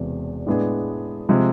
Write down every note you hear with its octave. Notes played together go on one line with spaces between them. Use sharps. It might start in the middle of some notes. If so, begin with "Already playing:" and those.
Already playing: E1 E2 C3
A2 G#3 B3 D4 G#4
C3 F3 G#3